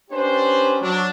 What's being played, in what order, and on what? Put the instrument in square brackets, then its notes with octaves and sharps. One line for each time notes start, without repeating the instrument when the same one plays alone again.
[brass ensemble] C#4 D4 G4 B4 C5
F#3 D4